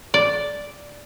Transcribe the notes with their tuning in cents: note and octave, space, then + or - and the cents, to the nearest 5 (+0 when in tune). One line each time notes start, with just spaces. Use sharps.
D5 -5